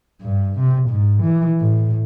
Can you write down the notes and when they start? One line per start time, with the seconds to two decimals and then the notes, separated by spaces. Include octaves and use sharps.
0.22 G2
0.59 C3
0.89 G#2
1.23 E3
1.60 A2